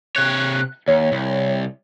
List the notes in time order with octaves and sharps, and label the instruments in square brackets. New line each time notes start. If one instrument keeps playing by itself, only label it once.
[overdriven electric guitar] C3 C#5 [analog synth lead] F#6
[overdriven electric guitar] D#2 [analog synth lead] C#5
[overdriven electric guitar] C2